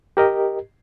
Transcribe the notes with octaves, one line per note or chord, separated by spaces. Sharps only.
G4 A#4 D#5